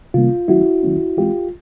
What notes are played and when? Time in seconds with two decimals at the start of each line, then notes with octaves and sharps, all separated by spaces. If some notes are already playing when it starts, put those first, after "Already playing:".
0.14 C3 D#3 G3 A#3 C#4 F4
0.48 D#3 F#3 A3 C#4 E4 F#4
0.83 D#3 F#3 A3 C#4
1.17 E3 G#3 C4 F4 G4